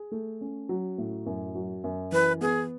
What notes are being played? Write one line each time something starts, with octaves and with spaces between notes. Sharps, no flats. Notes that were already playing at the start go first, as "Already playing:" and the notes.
Already playing: G#4
A3
C#4
F#3
A2
F#2
F#3
F#2
E3 B4
B3 G#4